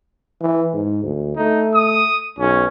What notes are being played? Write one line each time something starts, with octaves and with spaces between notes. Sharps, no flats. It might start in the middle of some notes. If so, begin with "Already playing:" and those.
E3
G#2
D2
A3 D#4
D#6
B1 C#4